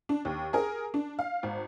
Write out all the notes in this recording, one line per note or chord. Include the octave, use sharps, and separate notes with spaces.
D4
D#2
G#4 A#4
D4
F5
G#1